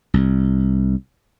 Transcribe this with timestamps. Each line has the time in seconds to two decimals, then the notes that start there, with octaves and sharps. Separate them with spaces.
0.14 C2